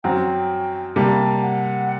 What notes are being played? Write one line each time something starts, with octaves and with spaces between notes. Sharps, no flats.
F#2 F#3 C4 G5
C3 G3 A#3 A5
F#5